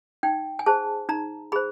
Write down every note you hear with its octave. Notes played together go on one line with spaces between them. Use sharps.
D#4 G5
G#5
G#4 C5 A5
D#4 A#5
G#4 C5 B5